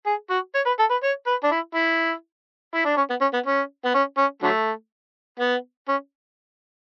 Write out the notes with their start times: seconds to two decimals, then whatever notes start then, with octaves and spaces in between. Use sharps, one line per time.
0.06 G#4
0.30 F#4
0.55 C#5
0.66 B4
0.79 A4
0.91 B4
1.03 C#5
1.27 B4
1.44 D4
1.52 E4
1.75 E4
2.74 E4
2.85 D4
2.97 C#4
3.10 B3
3.21 C#4
3.33 B3
3.46 C#4
3.85 B3
3.95 C#4
4.18 C#4
4.42 D3 F#3 A3
5.39 B3
5.88 C#4